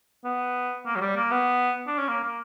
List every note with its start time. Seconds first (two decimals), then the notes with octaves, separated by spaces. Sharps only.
0.24 B3
0.86 A#3
0.96 F#3
1.01 G3
1.16 A#3
1.31 B3
1.87 D4
1.98 C#4
2.08 A#3
2.23 A#3